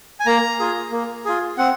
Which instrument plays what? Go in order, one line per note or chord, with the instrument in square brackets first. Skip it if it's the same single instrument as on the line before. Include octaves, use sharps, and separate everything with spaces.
[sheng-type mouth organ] G#5
A#3 A#5
F4 G#4
A#3
F4 G#4
C4 F#5